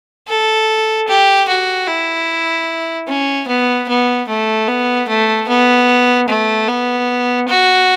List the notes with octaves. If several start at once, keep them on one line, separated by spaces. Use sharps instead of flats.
A4
G4
F#4
E4
C#4
B3
B3
A3
B3
A3
B3
A3
B3
F#4